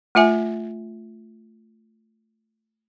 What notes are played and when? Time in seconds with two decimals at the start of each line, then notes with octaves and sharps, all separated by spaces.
0.15 A3 F4 E5 G#5